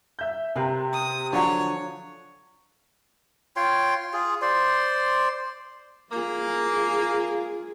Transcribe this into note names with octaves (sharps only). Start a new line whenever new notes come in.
E5 G6
C3 A#4 B4 F5
D#6
D3 F3 F#3 D4 C#5
F4 C#5 G5 C6
F4 G#4
C5 D5 C6
A#3 F4 G#4